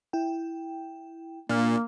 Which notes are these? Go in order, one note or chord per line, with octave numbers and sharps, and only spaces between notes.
E4 G5
A#2 A#3 D4 F6